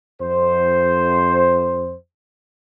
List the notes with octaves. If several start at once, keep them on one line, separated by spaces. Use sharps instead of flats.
F2 C5